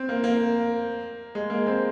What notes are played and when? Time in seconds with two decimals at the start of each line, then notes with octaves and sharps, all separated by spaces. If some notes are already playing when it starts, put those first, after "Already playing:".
Already playing: C4
0.09 A#3
0.24 A#3
1.35 G#3
1.50 A#3
1.67 C4